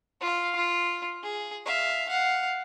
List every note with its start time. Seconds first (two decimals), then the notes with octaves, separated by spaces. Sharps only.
0.21 F4 F5
0.56 F4
1.23 G#4
1.66 E5 F5
2.09 F5 F#5